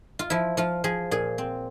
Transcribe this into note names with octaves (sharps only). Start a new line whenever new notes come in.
F4
F3 E4
F3 F4
F3 G#4
A#2 G#4
C4